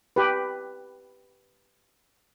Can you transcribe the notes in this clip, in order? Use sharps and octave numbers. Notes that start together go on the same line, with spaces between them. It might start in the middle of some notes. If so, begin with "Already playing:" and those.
G4 B4